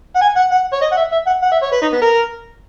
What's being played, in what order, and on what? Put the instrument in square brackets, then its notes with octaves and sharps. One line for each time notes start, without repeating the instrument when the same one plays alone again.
[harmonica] F#5
G#5
F#5
F#5
C#5
D#5
F#5
E5
E5
F#5
F#5
E5
C#5
B4
D#4
B3
A#4